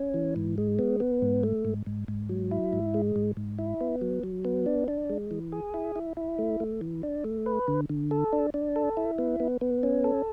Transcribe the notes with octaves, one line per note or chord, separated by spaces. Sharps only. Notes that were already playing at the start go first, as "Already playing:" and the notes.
Already playing: C#4
E3
G#2
G#3
B3
B3
G#2
A3
G#2
G#2
G#2
F#3
E4
G#2
G#3
G#2
G#2
E4
B3
F#3
F#3
B3
D4
D4
G#3
E3
G#4
E4
E4
E4
A3
A3
E3
D4
A3
B4
D3
D3
A4
D4
D4
A4
E4
B3
B3
B3
C#4
A4